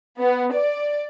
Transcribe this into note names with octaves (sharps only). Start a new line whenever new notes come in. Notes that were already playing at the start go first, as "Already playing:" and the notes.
B3
D5